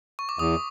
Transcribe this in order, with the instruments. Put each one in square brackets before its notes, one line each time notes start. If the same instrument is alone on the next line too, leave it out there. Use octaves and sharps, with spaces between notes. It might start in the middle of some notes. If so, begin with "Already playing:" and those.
[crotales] C#6
D6
[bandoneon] E2 [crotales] D#6